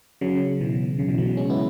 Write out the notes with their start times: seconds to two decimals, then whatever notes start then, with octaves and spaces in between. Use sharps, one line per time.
0.21 C#3 F#3
0.61 B2 E3
0.99 C#3
1.08 B2 E3
1.18 C#3 F#3
1.37 G#3 C#4
1.50 B3 E4